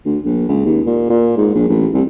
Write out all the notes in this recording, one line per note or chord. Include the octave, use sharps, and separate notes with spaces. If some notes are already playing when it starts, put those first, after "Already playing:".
D2
A#1
C#2
D#2
A#2
A#2
G#2
A#1
A1
C2